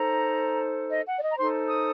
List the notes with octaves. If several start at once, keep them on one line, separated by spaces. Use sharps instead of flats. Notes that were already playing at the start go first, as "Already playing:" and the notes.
Already playing: D#4 A4 C5 A#5
D#5
F#5
D5
D#5
A#5
D#4 A4 C5 C6
D#6